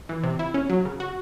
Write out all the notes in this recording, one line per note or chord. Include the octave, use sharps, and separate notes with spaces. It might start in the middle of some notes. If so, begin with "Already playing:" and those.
E3
C3
E4
C#4
F#3
C#3
F#4